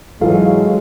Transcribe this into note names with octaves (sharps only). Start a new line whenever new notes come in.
G#2 E3 F#3 G#3 F4 A4 F5